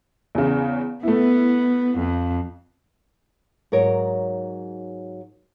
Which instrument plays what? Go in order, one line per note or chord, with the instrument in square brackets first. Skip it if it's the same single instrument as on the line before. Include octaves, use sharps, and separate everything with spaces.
[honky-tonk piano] E2 C#3
[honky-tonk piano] A3 E4 [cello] B3
[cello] F2
[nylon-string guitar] G#2 F#3 A#4 C#5